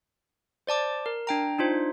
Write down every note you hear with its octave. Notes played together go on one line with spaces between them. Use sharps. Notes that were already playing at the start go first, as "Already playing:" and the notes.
C5 D5 A5 D6
A#4
D4 G5 A#5
D4 D#4 F4 C5